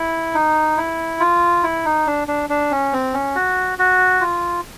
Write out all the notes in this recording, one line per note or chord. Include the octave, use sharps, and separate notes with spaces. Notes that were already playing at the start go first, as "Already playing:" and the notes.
Already playing: E4
D#4
E4
F4
E4
D#4
D4
D4
D4
C#4
C4
C#4
F#4
F#4
F4